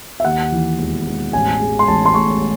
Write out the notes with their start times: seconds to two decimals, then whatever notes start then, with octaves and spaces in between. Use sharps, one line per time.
0.20 E5
0.25 D#2 F#5
0.52 E3
0.79 E1
1.06 E1
1.33 A1 G#5
1.60 G#3
1.79 C6
1.88 A1 A5
2.05 C6
2.14 A2 C#6